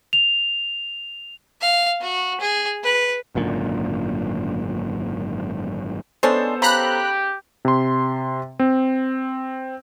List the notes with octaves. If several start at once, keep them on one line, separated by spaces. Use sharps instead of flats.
F7
F5
F#4
G#4
B4
G#1 F#2 A#2 D3
G#3 B3 C#4 D4 A4 C5
C#3 G4 A#5 B5 F#6
C3 C6
C4